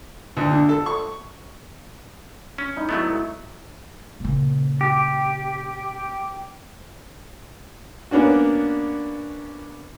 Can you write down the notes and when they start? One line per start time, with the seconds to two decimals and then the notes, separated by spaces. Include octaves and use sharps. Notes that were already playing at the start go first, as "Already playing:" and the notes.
0.37 D2
0.51 D3
0.69 A4
0.86 C#6
2.58 C#4
2.76 D#4 E4
2.89 F#3 A3 B3
4.20 A#2 C#3
4.81 G4
8.11 A#3 B3 C#4 D4 F#4